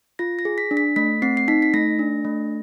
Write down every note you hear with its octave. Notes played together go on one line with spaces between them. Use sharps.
F4 A#6
A#6
G#4
B6
D4
B6
A3 B6
C4 C7
C7
D#4 B6
B6
A3 A#6
D4
A3